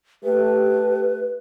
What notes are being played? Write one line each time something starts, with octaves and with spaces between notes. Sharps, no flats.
A3 G4 B4